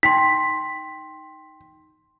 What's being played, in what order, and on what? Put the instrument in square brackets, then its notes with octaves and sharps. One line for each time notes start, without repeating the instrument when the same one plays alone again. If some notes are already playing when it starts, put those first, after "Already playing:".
[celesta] D#4 G5 C6 [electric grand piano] B6